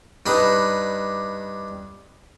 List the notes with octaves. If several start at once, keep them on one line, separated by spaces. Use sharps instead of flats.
G2 D4 D#4 B4